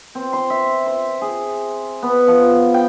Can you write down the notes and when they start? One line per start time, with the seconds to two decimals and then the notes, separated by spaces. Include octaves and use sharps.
0.15 C4
0.33 C6
0.50 E5
0.86 C5
1.21 G#4
2.02 B3
2.27 F3
2.74 G5